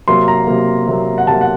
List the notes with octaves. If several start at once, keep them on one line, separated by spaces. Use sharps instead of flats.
C3 F#3 A#3 C6
A#5
C3 F#3 A#3
C3 F#3 A#3
F#5
C3 F#3 A#3 A5
F#5